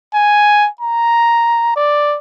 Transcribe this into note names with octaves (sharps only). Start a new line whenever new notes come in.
G#5
A#5
D5